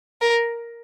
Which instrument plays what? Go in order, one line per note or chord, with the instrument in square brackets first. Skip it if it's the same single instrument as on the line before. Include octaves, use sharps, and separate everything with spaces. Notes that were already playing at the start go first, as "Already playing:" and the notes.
[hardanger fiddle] A#4